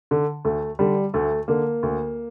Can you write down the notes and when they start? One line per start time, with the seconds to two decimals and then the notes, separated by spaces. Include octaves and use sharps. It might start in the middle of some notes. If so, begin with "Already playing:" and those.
0.11 D3
0.45 D2 A3
0.79 D3 G3
1.14 D2 A3
1.48 D3 A#3
1.83 D2